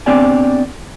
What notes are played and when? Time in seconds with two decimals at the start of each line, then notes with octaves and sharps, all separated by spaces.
0.06 B3 C4 D4 G4 D5 G#5